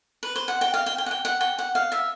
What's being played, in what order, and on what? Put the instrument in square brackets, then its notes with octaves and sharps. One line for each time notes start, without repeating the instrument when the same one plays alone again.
[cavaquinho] B4
C5
F#5
G5
F5
G5
G5
F#5
G5
F#5
G5
F#5
F5
E5